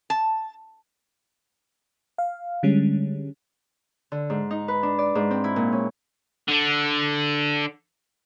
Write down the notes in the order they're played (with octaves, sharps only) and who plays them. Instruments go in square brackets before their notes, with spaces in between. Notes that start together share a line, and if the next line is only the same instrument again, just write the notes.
[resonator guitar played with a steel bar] A5
[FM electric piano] F5
D3 G3 G#3 C#4
[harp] D3
G#2
D#4
B4
D4
D5
G#2
C4
E4
A#2
C#4
[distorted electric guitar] D3 D4